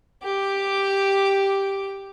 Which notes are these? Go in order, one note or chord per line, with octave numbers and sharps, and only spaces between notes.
G4 D6